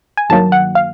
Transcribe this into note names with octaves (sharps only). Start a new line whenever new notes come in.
G#5
G2 D#3 F#3 A#3 A5
F#5
F5